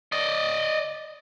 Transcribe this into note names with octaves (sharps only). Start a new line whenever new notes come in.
D5 D#5